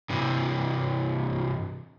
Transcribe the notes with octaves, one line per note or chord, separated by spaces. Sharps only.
G2 C3 E3